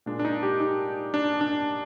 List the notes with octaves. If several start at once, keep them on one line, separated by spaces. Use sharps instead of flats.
A#2 G#3 D4
D4
D#4
G4
D#4
D4
D4